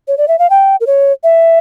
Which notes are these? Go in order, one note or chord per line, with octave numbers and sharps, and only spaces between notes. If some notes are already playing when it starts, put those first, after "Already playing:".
C#5
D5
E5
F5
G5
A#4
C#5
E5